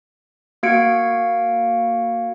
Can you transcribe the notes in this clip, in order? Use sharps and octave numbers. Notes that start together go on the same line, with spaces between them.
A#3 F#4 F5 G#6 C#7 D7